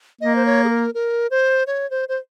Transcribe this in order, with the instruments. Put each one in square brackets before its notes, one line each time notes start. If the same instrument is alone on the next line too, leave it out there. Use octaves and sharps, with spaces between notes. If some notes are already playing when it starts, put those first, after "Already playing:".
[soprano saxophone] A#3 [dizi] D#5
[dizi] C5
C#5
G#4
A#4
A#4
C5
C#5
C5
C5